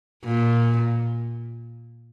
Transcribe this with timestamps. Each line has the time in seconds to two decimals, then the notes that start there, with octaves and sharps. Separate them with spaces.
0.24 A#2